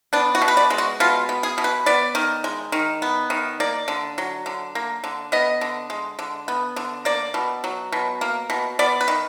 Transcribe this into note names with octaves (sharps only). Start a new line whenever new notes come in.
B3 D4
F#4
B2
B4
D5
G#3
F#4
B2 F4
B3
G#4
B2
B4
B3 D5
D#3
G#3
D#3
B3
D#3
A#3 D5
D3
F#3
D3
A#3
D3
B3 D#5
D3
G#3
D3
B3
D3
A#3 D5
B2
F#3
B2
A#3
B2
B3 D5
B4
D#3